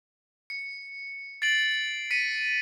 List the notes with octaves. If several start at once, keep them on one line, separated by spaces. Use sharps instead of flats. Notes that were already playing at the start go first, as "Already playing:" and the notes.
C#7
A6 C7 D7 F#7
B6 C#7 D#7